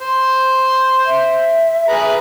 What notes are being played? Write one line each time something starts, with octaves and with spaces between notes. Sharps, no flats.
C5 C6
E5
G#4 B4 A#5